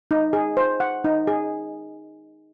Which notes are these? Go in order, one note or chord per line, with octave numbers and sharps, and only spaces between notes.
D#4
G#4
C5
F#5
D#4
G#4